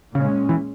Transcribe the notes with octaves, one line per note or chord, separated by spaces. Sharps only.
A#2 C#3 G#3 C#4
E3